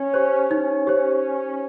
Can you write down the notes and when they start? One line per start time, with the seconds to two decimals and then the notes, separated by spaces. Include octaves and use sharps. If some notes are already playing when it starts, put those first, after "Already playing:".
Already playing: C#4
0.14 G4 C5
0.51 C#4 D#4
0.87 G4 C5